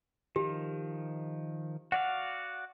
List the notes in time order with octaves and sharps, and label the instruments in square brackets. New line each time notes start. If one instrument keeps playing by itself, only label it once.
[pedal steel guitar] D#3 F3 [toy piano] G4
[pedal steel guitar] F#4 D5 F5 [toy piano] F#5